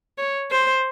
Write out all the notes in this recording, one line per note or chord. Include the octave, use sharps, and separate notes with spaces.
C#5
C5